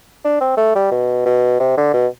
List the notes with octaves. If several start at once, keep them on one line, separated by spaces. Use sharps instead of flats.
D4
C4
A3
G3
B2
B2
C3
D3
B2